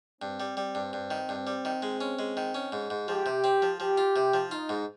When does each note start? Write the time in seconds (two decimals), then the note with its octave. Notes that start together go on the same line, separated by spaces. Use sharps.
0.22 G2 C4
0.40 G3
0.57 G3
0.75 G2
0.93 G2
1.11 D#3
1.29 G2
1.47 G3
1.65 D#3
1.82 G#3
2.01 C#4
2.19 G#3
2.37 D#3
2.54 C#4
2.72 G#2
2.90 G#2
3.08 F3 G4
3.26 C3
3.44 C4
3.62 F3
3.80 F3 G4
3.98 F4
4.16 C3
4.34 F3
4.51 D#4 F4
4.69 G#2